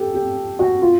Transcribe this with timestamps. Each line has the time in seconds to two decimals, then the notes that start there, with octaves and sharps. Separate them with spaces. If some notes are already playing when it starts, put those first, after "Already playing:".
Already playing: G4 A4
0.14 G4
0.59 F#4
0.82 F4